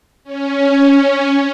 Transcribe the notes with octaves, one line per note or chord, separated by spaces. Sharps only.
C#4